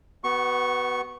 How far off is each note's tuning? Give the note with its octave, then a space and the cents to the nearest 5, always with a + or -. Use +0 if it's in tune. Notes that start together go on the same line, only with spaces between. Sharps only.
B3 +0 F#4 +35 C#6 -10